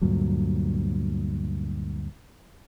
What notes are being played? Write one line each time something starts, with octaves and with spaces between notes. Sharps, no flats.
D2 G2 A#2 F#3